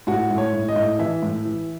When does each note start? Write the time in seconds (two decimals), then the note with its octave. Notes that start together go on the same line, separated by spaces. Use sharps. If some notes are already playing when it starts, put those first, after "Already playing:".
0.07 A2 F#4
0.31 A2
0.38 C#5
0.53 A2
0.68 D#5
0.76 A2
0.99 E3 E5
1.23 A2
1.45 E3